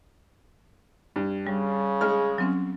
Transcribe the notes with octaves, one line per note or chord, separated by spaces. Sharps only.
G2
C#3 G3
G#3 F6
F#3 C4 C#4